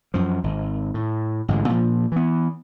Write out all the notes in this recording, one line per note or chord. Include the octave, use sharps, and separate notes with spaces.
F#2 F3
G#1
A2
A1 G#2 D3 G#3
A#2 F3
E3 B3